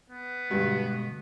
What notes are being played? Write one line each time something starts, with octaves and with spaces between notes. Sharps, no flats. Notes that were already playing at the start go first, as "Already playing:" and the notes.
B3
G2 B2 D3 G#3 F#4